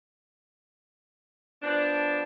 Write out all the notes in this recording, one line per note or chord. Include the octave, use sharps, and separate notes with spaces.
F3 B3 D4